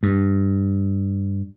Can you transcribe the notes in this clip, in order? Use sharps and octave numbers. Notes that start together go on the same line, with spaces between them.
G2